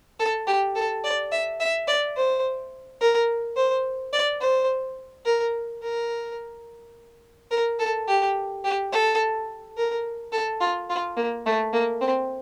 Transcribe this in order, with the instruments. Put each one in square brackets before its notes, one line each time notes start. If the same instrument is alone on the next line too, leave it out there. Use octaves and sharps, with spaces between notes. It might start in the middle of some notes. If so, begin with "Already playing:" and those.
[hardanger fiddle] A4
G4
A4
D5
E5
E5
D5
C5
A#4
C5
D5
C5
A#4
A#4
A#4
A4
G4
G4
A4
A#4
A4
F4
F4
A#3
A3
A#3
C4